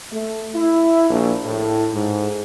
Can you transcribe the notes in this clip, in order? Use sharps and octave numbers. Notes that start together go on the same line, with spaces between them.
A3
E4
A#1
A2
G#2